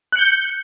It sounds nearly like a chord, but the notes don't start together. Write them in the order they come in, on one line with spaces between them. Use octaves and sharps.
F#6 C#7 G6